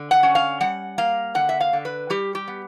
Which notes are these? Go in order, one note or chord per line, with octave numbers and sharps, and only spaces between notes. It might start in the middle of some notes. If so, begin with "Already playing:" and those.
Already playing: D3
F#5
C#4
F5
G3 F#5
A#3 F5
D3 F#5
E5
F5
D3
B4
G3 G4
G4
B3